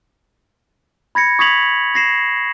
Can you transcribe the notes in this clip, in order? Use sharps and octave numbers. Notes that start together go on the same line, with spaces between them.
B5 G#6 A#6 C#7
C#6 D#6 G#6 B6 F7 F#7
G#6 A#6 C7 E7